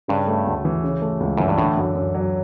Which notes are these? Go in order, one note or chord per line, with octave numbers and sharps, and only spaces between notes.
G2 C#3
A3
D2
E3
C#3
A3
C#2
F#2 E3
G2
A2 D3
F#2
F#2
F#3